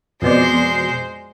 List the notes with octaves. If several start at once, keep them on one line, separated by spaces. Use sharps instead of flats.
F2 B2 G#3 C5 D5